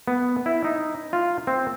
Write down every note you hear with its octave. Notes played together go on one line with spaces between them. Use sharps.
B3
E4
D#4
F4
C4